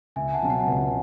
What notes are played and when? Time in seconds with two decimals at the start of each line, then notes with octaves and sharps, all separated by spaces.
0.16 C#2 E5 G#5
0.34 F#5 A5
0.42 B2 F#3 C#4
0.50 F#5 A5
0.67 C#2